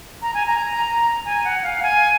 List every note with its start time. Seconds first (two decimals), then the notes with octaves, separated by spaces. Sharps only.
0.22 A#5
0.34 G#5
0.46 A#5
1.25 G#5
1.44 F#5
1.63 F5
1.83 G#5